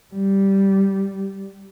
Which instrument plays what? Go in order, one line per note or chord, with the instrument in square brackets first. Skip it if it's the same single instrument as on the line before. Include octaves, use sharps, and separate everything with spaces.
[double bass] G3